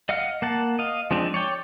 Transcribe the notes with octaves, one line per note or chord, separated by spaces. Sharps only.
D#5 F5 F#5 F6
A#3 F#5 A5
D#5 F5
F3 G#3 C4 D4
C#5 D5 G5